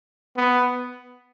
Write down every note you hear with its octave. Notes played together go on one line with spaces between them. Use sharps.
B3